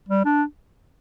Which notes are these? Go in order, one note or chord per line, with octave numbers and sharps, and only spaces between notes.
G3
D4